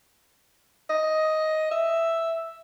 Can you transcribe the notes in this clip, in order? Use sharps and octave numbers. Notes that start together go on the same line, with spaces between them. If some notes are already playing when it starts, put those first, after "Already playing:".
D#5
E5